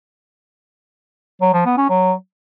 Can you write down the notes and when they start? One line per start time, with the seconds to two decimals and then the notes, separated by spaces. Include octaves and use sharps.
1.42 F#3
1.54 F3
1.66 B3
1.78 C#4
1.89 F#3